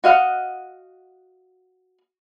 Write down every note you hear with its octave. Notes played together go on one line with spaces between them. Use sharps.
F#4 D#5 F5 F#5